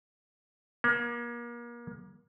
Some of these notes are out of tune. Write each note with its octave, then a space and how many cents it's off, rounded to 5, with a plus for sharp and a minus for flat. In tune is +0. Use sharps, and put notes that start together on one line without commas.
A#3 +35